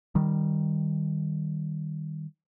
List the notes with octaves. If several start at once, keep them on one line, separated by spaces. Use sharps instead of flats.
D#3 G3